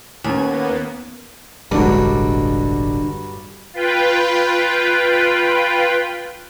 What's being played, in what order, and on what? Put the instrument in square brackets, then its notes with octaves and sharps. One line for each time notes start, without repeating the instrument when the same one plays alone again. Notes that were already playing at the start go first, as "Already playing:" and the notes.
[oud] D#2 [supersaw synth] A#3 B3 [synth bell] C#4 G#5
[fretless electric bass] E1 A1 D4 [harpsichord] G2 F#3 [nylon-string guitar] D3 G#3
[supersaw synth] F4 B4 G5